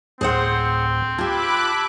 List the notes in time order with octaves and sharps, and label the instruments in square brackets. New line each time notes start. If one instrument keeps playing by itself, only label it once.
[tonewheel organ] D2 A2 [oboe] C4 [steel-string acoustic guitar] G#4 C5 F#5
[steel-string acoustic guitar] F4 G4 [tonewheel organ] A5 E6 G#6 [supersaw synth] B5 D6 F#6